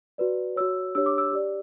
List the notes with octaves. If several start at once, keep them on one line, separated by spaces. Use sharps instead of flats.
F#4 B4 D5
F#4 C#5 E6
D4 G4 C#5 E6
D6
E6
G4 D5